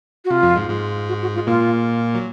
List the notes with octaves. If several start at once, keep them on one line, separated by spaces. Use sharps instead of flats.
F#4
C3 F4
F2 F3
G#2 G#3
G#2 G#3
F#4
F#4
F4
G#3
A#2 A#3 F4
F#3